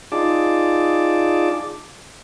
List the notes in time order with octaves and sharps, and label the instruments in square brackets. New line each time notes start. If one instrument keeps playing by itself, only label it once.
[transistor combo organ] D#4 F4 G#4 D5 A5 D6